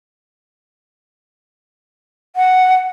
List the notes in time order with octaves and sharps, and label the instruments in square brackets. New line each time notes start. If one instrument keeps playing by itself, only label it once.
[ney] F#5